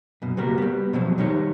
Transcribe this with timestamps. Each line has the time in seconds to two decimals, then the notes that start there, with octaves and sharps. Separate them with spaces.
0.22 F#2 B2
0.37 C#3 G3 A#3 B3 F#4 A#4
0.58 G3 B3
0.93 B2 F3 F#3 G#3 C4
1.18 D#3 G3 D#4 C#5